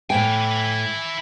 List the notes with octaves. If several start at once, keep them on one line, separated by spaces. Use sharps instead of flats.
A2 E4 G5 G#5